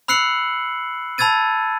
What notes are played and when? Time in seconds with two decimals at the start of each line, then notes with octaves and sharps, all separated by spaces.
0.08 B5 E6 F#6 C7 C#7 F#7
1.18 A5 B5 E6 G#6 A6 D#7